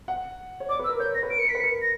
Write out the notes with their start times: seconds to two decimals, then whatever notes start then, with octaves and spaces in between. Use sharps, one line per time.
0.08 F#5
0.60 C#5
0.69 D5 D6
0.79 B4
0.84 E6
0.89 A#4
1.00 C#5 G6
1.15 C#5 A#6
1.23 B4
1.30 A#4 D7
1.39 C#7
1.45 A#4 B6
1.55 B4
1.60 A#4 C#7
1.81 A#6